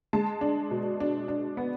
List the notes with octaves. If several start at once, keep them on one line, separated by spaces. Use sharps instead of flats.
G#3 A5
D4
B2
D4
D4
B3